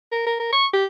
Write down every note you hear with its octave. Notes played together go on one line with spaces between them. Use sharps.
A#4
A#4
A#4
C#6
G4